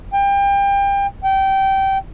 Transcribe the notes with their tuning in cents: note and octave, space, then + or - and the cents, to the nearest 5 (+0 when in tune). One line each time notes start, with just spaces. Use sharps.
G5 +30
G5 -20